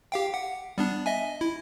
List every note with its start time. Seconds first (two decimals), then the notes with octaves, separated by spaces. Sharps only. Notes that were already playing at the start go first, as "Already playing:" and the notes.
0.12 G4 F5 G5
0.34 F#5
0.78 G3 B3 D4
1.06 D#5 E5 G#5
1.41 E4